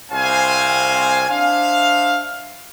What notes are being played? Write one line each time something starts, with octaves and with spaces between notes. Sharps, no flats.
C2 C4 C5 F5 G#5
D4 C5 E5 F5